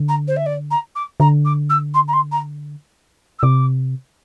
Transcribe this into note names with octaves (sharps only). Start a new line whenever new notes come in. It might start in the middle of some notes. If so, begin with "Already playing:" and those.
Already playing: D3
A#5
C5
E5
D5
A#5
D6
D3 A#5
D6
E6
C6
A#5
C6
A#5
E6
C3 D6